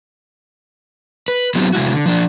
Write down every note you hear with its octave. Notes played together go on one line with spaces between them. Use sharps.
B4
F#3 B3 C4 D#4 F4 G4
C3 G#3 E4 F#4
D3
F3 D4